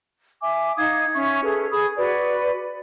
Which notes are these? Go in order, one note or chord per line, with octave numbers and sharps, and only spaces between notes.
E5 G#5 D6
D#4 F5 D#6 G#6
C#4 E5 C#6
G#4 A4 B4
G#4 B5 D#6
F#4 B4 D5